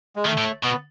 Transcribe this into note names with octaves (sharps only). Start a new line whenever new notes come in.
G#3
D#3 A3
A2
B2 B3